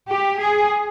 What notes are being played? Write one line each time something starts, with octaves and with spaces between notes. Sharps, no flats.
G4
G#4